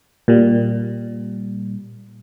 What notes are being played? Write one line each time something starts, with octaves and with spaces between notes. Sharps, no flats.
A#2 G3